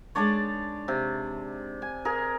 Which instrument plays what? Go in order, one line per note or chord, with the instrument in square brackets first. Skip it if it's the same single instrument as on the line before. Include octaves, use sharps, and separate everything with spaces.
[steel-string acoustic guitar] G#3 D4 D#4 [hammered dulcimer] C#5 D5 A5
[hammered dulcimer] C3
G#5
G#4 A#4